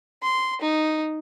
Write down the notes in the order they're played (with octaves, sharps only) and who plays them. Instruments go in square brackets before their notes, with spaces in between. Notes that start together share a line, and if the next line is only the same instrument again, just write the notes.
[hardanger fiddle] C6
D#4